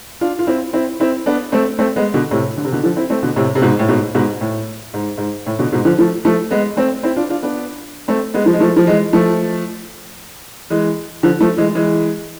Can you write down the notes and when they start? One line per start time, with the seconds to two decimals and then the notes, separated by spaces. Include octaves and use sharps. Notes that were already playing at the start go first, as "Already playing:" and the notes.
0.21 D4 F4
0.39 F4
0.47 C4 E4
0.73 C4 E4
1.00 C4 E4
1.26 B3 D4
1.52 A3 C4
1.79 A3 C4
1.96 G#3 B3
2.14 B2 D3
2.31 A2 C3
2.57 D3
2.65 C3
2.72 B2 D3
2.83 D3 F3
2.96 C4 E4
3.10 A3 C4
3.23 B2 D3
3.36 A2 C3
3.55 C3
3.62 G#2 B2
3.79 A2
3.88 G#2 B2
4.15 G#2 B2
4.41 A2
4.94 G#2
5.18 G#2
5.46 A2
5.59 B2 D3
5.72 G#2 B2
5.85 D3 F3
5.98 F3 A3
6.25 F3 A3
6.51 G#3 B3
6.77 A3 C4
7.03 C4 E4
7.16 D4 F4
7.30 D4 F4
7.43 B3 D4
8.08 A3 C4
8.34 G#3 B3
8.46 F3
8.53 G#3
8.60 F3 A3
8.76 F3
8.87 E3 G#3
9.13 F3 A3
10.70 E3 G#3
11.23 D3 F3
11.40 F3 A3
11.58 E3 G#3
11.75 E3 G#3